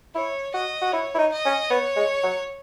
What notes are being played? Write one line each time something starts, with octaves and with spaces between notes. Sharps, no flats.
E4 C#5
F#4 D#5
F#4
E4 C#5
E4
D#4
D#5
C#4
B3 C#5
G#3
F#3